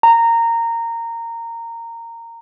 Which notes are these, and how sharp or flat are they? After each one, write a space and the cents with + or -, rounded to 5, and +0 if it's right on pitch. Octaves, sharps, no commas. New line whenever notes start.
A#5 -15